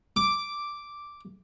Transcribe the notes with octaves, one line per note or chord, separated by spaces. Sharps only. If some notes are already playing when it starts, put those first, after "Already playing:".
D6